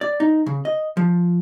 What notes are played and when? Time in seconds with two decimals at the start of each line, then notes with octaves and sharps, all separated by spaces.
0.01 D5
0.20 D#4
0.46 C#3
0.65 D#5
0.97 F3